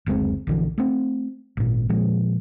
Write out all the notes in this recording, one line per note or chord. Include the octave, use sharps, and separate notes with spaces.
F#1 D2 G#3 C4
A#1 D3 E3
A3 C4
G#1 A#2
A#2 F3 G#3